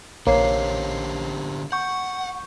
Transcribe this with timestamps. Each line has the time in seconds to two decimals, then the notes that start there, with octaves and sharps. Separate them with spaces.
0.27 A#1 D3 A#3 G4 C5 C#5 C7
1.72 F#5 C#6 G6